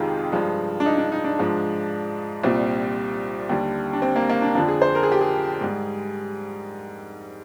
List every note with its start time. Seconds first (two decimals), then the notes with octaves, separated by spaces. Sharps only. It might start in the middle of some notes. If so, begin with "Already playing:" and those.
Already playing: F2 C3 D#3 G#3 F4 G4 G#4
0.32 G2 F3 G#3
0.80 D4
0.86 D#4
0.98 D4
1.12 D#4
1.24 D4
1.39 G#2 F3 G#3
2.43 C2 A#2 G3 C4
3.49 D#2 D3 G3
3.93 D4
4.02 C4
4.16 A#3
4.30 A#3
4.42 D4
4.55 F2 D3 F3 D4
4.68 G#4
4.82 C5
4.95 A#4
5.03 G#4
5.12 G4
5.21 G#4
5.61 G#2 G3